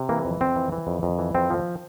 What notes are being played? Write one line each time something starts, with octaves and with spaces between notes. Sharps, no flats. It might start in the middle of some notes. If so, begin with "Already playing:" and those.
Already playing: C3
E3 A#3
F2
F2 C4
E3
E3
F2
F2
E3
F2 C4
F3